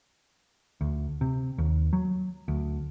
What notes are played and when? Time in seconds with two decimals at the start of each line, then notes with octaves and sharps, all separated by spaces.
0.81 D2
1.21 C3
1.58 D#2
1.93 F#3
2.48 D2